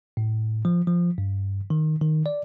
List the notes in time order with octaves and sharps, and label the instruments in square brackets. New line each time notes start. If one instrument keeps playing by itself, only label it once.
[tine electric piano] A2
F3
F3
G2
D#3
D#3
D5